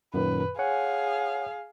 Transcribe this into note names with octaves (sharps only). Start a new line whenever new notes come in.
F#2 A#2 D#3 B4
G#4 C#5 F5 F#5 G#5